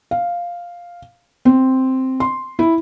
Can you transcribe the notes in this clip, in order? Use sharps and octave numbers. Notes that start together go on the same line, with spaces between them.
F5
C4
C6
E4